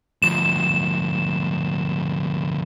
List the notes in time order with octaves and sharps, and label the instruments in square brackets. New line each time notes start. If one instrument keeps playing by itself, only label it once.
[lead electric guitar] D2 F3 [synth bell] E7